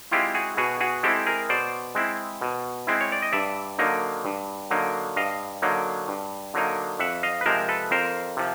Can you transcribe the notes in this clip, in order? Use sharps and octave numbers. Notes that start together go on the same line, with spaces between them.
G#3 C4 E4 F4 G4
F#4 G#4
B2 F#4 G#4
F#4 G#4
G#3 C4 E4 G4 A4
G#4 A#4
B2 C5 D5
G#3 C4 E4
B2
G#3 C4 E4
C#5
D5
D#5
G2 D5 E5
D3 F#3 A#3 D#4
G2
D3 F#3 A#3 D#4
G2 D#5 F5
D3 F#3 A#3 D#4
G2
D3 F#3 A#3 D#4
F2 E5 F#5
D#5 F5
B4
C3 F3 G#3 A#4 C5
A4 B4
F2 A#4 C5
C3 F3